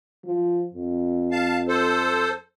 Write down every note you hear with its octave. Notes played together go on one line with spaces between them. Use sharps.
F3
F2
F5 A5
A4 C5